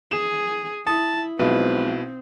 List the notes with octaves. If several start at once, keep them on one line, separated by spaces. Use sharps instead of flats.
G#4 G#5 E7
E4 A5 D#6
B1 B2 F3 G#3 C4 E4 B4